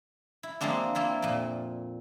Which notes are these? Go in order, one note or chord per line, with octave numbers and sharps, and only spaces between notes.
E4
F3 G#3 A#3 C4 D4
A#3 C4 E4 F4
F2 A#2